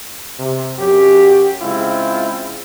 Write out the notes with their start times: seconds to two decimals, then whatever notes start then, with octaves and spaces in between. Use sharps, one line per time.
0.39 C3
0.79 F#2 F#3 G4
1.62 C#3 G#3 C4 E4 F4